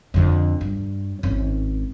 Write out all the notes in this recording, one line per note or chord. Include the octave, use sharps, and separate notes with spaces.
F2 D3
G2
G#1 C#4